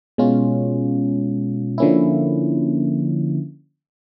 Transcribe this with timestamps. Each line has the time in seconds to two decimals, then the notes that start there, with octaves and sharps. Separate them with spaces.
0.18 B2 G#3 C#4 F4
1.78 D3 F3 A#3 C#4 E4